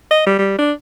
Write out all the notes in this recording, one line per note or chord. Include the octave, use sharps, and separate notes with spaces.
D#5
G3
G3
D4